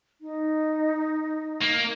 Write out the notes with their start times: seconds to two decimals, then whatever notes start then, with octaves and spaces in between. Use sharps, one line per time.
0.21 D#4
1.62 A#3